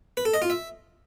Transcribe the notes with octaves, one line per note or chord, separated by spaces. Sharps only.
B4
A4
D#5
F4
E5